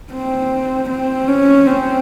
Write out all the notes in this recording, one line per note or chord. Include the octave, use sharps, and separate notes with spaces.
C4
C4
C#4
C4